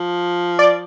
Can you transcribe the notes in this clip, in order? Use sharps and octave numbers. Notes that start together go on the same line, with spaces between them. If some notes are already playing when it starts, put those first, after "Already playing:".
Already playing: F3
D5